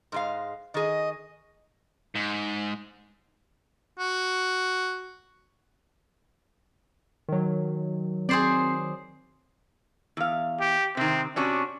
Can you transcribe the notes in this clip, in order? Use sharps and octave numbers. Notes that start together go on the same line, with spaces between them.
G#2 G#3 F5
D#3 G#4 D#5
G#2
F#4
D#3 F#3
C4 G#4 C5 D5 C7
E2 F5
G4
C3 D#3 C4
C3 C#4 D4 F#4